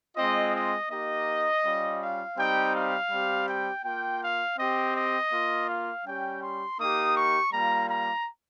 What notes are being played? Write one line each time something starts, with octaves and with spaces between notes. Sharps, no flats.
G#3 C4 F4 D#5
D#5
A#3 D#4 G4 D#5
G3 C#4 F4
F5
G3 C4 D#4 G4 G5
F5
G3 C4 G4
G5
A#3 F4 G5
F5
C4 G4 D#5
D#5
A#3 F4
F5
G3 C#4 G4 G5
C6
A#3 D#4 G4 D#6
C#6
G3 A#3 F4 A#5
A#5